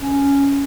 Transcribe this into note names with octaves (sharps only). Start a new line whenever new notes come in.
C#4